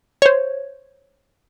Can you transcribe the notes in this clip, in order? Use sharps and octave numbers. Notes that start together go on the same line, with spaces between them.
C5 C#5